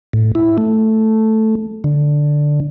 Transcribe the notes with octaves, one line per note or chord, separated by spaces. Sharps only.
A2
E4
A3
D3